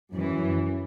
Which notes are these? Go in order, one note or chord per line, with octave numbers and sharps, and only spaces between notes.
F#2 E3